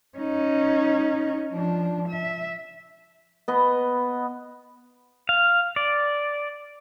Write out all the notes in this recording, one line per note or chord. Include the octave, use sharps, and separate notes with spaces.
C#4 D#4
F3 D4
E5
B3 D#5
F5
D5